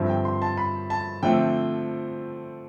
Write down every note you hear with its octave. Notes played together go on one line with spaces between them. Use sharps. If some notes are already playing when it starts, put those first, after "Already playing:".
Already playing: G2 D3 F3 C4 E5
G5
C6
A5
B5
A5
D3 F3 A3 C4 G5